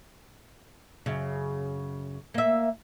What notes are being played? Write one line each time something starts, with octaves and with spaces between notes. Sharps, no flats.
F#2 C#3
A#3 E5